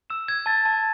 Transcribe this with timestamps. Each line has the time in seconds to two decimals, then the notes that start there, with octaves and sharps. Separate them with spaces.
0.10 E6 E7
0.28 E6 G#6
0.46 A5 A6
0.65 A5